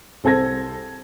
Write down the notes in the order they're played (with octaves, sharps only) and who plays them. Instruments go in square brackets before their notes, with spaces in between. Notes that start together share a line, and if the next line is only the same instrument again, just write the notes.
[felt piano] C2 C4 A4 C5 G#6 A#6